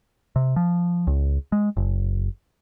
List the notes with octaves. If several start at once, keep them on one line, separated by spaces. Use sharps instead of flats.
C3
F3
C#2
G#3
F#1